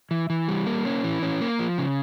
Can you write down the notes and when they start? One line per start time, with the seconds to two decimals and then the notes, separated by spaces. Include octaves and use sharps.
0.11 E3
0.30 E3
0.48 G3
0.67 A#3
0.85 C#4
1.04 E3
1.22 C#4
1.41 A#3
1.59 F3
1.78 C#3